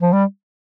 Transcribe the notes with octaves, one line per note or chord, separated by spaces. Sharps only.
F3
G3